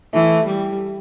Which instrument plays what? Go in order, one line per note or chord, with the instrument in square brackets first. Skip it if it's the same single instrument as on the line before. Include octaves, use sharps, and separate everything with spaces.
[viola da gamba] E3 [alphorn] A3
[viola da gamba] G3